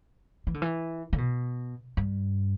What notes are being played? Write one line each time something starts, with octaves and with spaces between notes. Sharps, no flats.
E3
D3
E3
D3
B2
G2